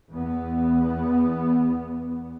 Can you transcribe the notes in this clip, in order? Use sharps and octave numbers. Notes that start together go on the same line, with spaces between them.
E2 B3